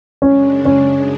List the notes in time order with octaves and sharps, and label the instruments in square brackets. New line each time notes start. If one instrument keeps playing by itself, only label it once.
[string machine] F#2 C#3 G#3 D4 [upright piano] C#4
[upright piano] C#4